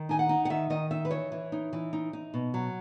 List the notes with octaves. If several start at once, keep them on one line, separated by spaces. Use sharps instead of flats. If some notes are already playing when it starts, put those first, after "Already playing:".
Already playing: D#3
D#4 G#5
F#5
D#4
F#5
D#3 E5
D#3 D#5
D#4 E5
B4
E3 C#5
E3
D#4
E3
D#4
D#4
B2
F#3